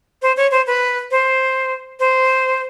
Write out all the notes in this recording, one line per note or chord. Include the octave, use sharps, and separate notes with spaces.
C5
C#5
C5
B4
C5
C5